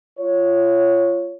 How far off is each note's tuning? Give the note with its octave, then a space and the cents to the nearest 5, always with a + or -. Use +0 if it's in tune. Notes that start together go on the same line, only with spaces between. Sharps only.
F4 -20 C#5 +0